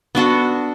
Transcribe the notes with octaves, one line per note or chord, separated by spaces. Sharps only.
B3 D4 F#4 A4